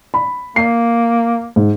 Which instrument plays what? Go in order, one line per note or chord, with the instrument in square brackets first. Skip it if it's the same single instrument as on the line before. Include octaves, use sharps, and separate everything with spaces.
[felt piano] B5
[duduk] A#3 [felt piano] C7
[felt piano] G#2